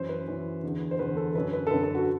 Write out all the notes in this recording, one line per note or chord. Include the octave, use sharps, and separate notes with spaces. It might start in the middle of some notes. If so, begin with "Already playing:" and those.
Already playing: F#2 E3 C5
B4
F#2 E3
E2 D3
C5
E2 D3 B4
A4
F#2 D3 B4
B4
A4
F#2 D3 B4
A4
F#4